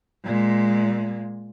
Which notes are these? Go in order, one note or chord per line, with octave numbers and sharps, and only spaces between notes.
A#2 G#3